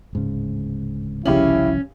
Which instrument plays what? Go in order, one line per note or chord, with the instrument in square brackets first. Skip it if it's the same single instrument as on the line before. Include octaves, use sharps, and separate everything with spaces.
[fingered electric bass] D1 G#2 C#3
[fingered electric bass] G1 C2 F3 [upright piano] C#3 G4 F#7 [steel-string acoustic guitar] C#4 [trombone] E4